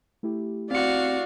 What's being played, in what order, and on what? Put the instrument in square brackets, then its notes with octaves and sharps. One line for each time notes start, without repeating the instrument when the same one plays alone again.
[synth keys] A3 E4 G4
[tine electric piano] C4 C#7 [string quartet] F#4 F5 [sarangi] D5